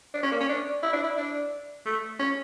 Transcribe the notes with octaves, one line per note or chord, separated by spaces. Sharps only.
D4
C#4
A#3
C#4
D4
E4
D4
E4
D4
A3
C#4